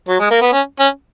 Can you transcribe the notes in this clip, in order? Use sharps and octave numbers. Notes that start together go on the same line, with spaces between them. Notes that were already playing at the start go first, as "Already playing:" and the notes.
F#3
G#3
A#3
B3
C#4
C#4